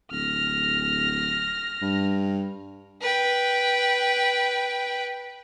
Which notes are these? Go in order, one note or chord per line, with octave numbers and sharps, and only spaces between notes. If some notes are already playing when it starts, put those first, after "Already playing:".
D1 F6 A#6
G2
B4 G5